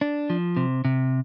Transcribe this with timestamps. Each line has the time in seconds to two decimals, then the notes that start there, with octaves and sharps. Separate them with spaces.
0.01 D4
0.30 F3
0.57 C3
0.85 C3